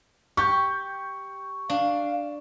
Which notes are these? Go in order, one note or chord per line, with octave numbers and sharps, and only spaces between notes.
G4 C#6 G6
D4 F5